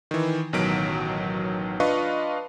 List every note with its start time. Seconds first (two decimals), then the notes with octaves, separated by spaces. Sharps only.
0.11 D#3 E3
0.53 A1 B2 D#3 F#3 B6 D7
1.80 D4 F4 B4 D#5 F5 C#6